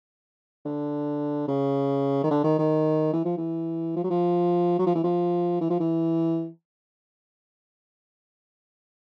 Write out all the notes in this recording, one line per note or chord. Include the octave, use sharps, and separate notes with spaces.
D3
C#3
D#3
D3
D#3
D#3
E3
F3
E3
F3
F#3
F3
F#3
F3
E3
F3
E3
F3
E3